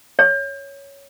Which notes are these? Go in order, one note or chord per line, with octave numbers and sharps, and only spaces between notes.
C#5